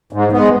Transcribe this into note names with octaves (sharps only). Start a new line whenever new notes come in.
G#2
G#3 B3